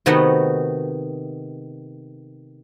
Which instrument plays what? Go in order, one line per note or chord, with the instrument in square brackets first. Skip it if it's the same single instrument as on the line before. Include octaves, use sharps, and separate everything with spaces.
[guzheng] C3 D#3 A3 B3 D#4 F#4